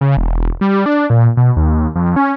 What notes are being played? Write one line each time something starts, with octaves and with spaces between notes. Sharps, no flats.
C#3
E1
G3
D4
A#2
B2
D#2
F2
C#4